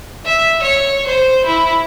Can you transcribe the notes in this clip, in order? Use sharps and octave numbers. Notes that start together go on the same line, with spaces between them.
E5
C#5
C5
E4